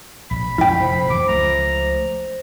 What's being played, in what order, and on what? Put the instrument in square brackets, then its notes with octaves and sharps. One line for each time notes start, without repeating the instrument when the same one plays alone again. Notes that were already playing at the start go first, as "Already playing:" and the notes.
[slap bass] A#1 [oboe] B5
[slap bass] F2 F3 G#3 [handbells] E4 G5
[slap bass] F1 A#2 [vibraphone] C5
[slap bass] F2 E3 F#3 [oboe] D6
[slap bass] C#2 F3 A3 [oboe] A#5